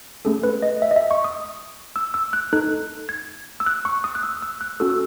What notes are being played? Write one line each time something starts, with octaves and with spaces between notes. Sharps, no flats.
A3 C#4 G#4 A4
B4
D#5
E5
D#5
E5
C#6
D#6
E6
E6
F#6
D#4 A4 F#6
G#6
E6
F#6
C#6
D#6
F#6
E6
E6
F#6
C#4 F#4 A4 E6
E6